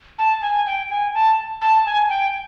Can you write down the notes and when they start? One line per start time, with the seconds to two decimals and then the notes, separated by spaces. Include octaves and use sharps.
0.18 A5
0.42 G#5
0.66 G5
0.90 G#5
1.14 A5
1.61 A5
1.86 G#5
2.09 G5